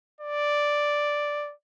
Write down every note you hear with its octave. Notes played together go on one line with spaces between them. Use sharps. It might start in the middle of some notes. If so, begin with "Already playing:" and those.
D5